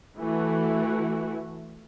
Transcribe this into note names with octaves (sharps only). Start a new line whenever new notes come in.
E3 A3 F#4